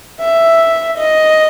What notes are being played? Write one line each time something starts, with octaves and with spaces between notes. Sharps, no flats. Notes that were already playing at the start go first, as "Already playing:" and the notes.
E5
D#5